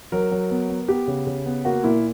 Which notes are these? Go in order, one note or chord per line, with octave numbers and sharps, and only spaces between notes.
F#3 A#4
F#3
B3
B3
B3 G4
C#3
C#3
B3
A#3 F#4
A#2 E4